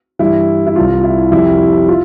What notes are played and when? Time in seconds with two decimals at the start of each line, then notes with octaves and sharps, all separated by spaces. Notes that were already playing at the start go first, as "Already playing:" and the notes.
0.19 G2 E3 G3 E4
0.67 E4
0.76 C2 C3 G3 F4
1.03 E4
1.31 F2 C3 G3 E4
1.88 F4